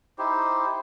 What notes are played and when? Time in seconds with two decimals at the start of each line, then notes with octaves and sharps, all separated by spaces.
0.18 D#4 E4 G4 C5